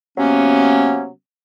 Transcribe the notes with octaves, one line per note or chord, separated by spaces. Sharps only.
C3 F#3 A#3 B3 C#4